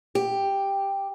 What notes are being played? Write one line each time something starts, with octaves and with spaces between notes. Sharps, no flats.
G4